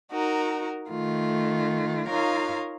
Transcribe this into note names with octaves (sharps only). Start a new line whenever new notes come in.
D#4 F#4 A#4
D#3 A3 F4
D#4 F4 A#4 C#5 F5